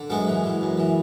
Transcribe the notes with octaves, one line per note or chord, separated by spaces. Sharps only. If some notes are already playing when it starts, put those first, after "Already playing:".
Already playing: D3
F#2 G#3 B3
E3
E3
F#2
E3